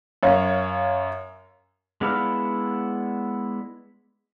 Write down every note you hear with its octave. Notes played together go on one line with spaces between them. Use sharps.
F#2 C#5 F5
G#3 B3 D4 E4 F5